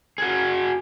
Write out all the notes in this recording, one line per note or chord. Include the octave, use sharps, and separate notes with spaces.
F#4 G#4